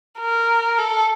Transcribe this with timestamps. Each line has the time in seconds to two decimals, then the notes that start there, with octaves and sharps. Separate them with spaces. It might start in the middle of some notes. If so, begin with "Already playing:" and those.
0.20 A#4
0.78 A4